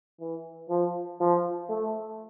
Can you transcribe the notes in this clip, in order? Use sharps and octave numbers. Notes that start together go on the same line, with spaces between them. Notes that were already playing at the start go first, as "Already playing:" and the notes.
E3
F3
F3
A3